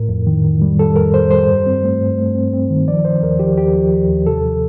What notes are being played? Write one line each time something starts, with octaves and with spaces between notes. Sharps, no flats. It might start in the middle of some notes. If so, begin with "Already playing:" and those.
Already playing: A2 A#4
F2
D#3
D#3
G3
G3 A4
F2 A#4
F2 C5
G3 C5
G2
C4
A3
G2
A3
C4
C4
D#3
F3 D5
F3 C5
D#2 A#4
F3 G4
D#2 G4
F3
D#2
D#2
C3 A4
F3